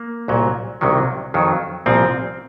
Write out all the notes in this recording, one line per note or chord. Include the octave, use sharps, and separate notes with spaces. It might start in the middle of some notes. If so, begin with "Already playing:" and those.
Already playing: A#3
C2 A#2 F#3
C2 C3 D#3 F#3
F2 D#3 F#3
C2 A#2 F3 C4